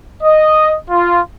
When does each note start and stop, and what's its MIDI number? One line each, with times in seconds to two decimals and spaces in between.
0.22 0.75 75
0.89 1.21 65